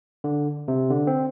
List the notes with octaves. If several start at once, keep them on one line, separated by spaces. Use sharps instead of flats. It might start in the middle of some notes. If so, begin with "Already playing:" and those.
D3
C3
D3
C4